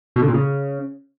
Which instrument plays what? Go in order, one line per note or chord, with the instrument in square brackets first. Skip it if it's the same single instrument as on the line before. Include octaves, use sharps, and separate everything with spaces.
[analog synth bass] B2
D3
A#2
C#3